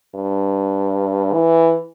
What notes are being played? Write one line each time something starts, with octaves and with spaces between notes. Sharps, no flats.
G2
E3